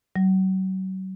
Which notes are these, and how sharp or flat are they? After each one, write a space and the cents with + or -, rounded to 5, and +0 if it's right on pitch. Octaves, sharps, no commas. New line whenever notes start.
F#3 +35